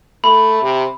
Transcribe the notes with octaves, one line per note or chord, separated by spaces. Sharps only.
A3 B5
C3